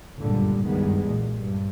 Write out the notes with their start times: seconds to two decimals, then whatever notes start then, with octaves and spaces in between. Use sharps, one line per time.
0.19 G1 C#2 F#2 A#2 D3 G3
0.67 C#2 G2 D#3 G3 G#3 B3
1.04 B1 E2 A#2
1.36 G2